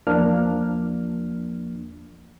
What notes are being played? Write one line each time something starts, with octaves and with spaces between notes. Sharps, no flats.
E2 F3 A#3 D4 F6